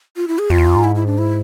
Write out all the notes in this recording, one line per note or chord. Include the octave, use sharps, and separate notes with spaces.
F4
E4
G#4
F2 F4
E2
F2
G#2
E4
E4
D4
E4